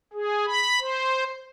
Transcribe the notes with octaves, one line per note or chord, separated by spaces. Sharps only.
G#4
B5
C5